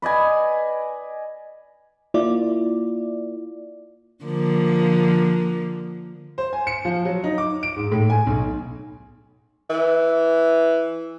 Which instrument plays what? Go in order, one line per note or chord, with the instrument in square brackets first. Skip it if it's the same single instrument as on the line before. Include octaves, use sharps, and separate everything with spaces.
[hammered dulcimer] B4 D5 D#5 G#5
[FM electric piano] A#3 E4 F4 D5
[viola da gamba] D3 F3 A#3
[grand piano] C5
G#5
C#7
F3
F#3
D#4
D6
D7
G#2
A2
G#5
B1
[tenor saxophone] E3